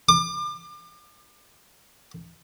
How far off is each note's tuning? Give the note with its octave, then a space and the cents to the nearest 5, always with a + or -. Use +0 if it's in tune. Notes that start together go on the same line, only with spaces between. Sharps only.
D6 +35